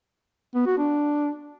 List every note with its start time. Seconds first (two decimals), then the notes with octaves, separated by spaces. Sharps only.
0.55 B3
0.66 F#4
0.78 D4